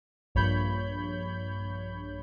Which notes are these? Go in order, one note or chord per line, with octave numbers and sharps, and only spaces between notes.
A#1 G2 C#5 B5 G6